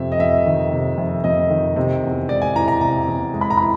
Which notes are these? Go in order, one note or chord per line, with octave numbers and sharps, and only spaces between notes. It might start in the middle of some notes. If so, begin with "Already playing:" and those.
Already playing: F2 C3 E5
D#5
F2 E5
D#3
C3
F2
F2 D#5
D#3
C3
E2
G#3 D5
G#5
E3 A#5
A#5
C3 A#5
E2
G#3
B5
A#5
E3 B5